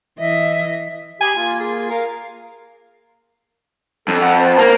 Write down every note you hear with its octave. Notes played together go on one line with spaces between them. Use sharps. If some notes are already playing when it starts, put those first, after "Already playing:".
E3 D#5 E5
G4 G#4 G#5 B5
A#3 F4
G#4
A#4 F5
F2 A4
F#5
C5
A#3